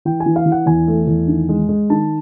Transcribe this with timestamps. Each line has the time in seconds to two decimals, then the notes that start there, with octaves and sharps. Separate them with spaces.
0.05 E3 G5
0.20 G#5
0.26 E3
0.36 F5
0.46 E3
0.52 F#5
0.66 E2 G#5
0.88 A3
1.07 E2
1.28 D#3
1.49 G#3
1.69 G#3
1.90 D#3 A5